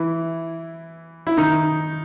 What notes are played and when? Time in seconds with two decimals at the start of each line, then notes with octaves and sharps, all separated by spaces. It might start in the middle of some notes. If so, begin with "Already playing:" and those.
Already playing: E3 E4
1.27 E4
1.37 D#3 D#4